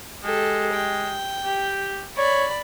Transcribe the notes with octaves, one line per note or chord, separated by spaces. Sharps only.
G#3 G4 A4
G5
G4
C#5 D5 B5